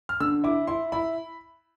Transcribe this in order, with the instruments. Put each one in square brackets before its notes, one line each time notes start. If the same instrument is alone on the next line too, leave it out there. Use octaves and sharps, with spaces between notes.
[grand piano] F6
[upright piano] D3 [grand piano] E6
[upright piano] E4 [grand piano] D6
[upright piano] E4 [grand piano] C6
[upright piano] E4 [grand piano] B5